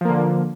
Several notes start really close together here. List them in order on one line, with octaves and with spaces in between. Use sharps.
F3 A#3 D3